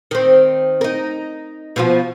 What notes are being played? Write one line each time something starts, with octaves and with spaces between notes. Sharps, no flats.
D#3 C4
D#4 A#4
B2 F3 F4